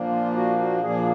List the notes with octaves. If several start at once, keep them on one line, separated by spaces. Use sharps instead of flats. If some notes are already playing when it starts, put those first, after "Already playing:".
Already playing: A#2 F3 A#3 D4
F4
F#4
F#4
A#2 F3 A#3 D4 G#4